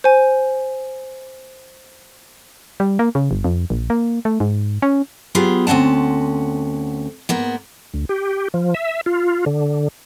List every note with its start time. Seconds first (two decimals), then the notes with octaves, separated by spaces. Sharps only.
0.04 C5 G#5
2.80 G3
2.99 A#3
3.15 C#3
3.31 G1
3.44 F2
3.70 A#1
3.90 A#3
4.25 A3
4.40 G#2
4.82 C#4
5.35 F#3 B3 F4 G4 G#4
5.67 D2 C4 C#4 F#5 A5
7.29 G#2 A#3 B3
7.94 D2
8.09 G4
8.54 F3
8.74 E5
9.06 F4
9.46 D3